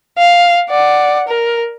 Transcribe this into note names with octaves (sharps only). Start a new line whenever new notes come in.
F5
D5 F#5
A#4